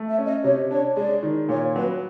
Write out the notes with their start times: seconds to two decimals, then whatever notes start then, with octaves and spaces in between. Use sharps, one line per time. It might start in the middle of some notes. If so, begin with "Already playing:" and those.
Already playing: A3
0.09 E5
0.18 C#4
0.26 D#5
0.44 C3 C#5
0.71 D4 C#5
0.96 G#3 D5
1.23 D#3
1.49 A#2 C#5
1.75 F#3 B4